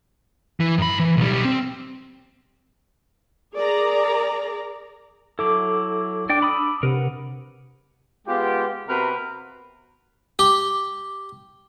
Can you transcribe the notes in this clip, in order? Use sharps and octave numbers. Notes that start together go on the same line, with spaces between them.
E3
F#2 B5
E3
B1 G3
C4
G#4 A#4 D5 A#5
F#3 E4 A4 D6
D4 D5 G5 D6
B5 D#6 E6
C3 A#4 B4 F#5
G#3 B3 F4 G4
C3 B3 F#4 A#4 B4 A#5
G4